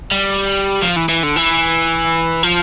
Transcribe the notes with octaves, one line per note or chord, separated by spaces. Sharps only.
G3
F3
E3
E3
D3
E3
F3